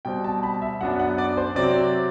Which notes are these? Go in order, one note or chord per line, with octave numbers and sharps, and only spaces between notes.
B2 G3 C4 G5
A5
B5
E5
F#2 F#3 B3 D4 F#5
F#5
D5
C5
C3 F#3 C4 D5